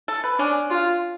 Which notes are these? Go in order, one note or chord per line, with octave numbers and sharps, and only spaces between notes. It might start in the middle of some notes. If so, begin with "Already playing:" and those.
A4
B4
C#4 D4
F4